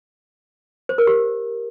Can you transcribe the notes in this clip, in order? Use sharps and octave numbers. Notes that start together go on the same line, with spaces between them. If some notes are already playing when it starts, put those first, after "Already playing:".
C5
A#4
G4